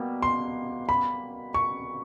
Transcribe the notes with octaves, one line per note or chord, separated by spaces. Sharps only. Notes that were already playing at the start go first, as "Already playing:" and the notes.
Already playing: B2 G3 A#3
C6
B5
C#6